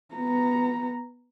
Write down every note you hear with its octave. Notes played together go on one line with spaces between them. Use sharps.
B3 A#5